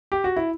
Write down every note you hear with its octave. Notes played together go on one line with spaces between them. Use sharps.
G4
F#4
E4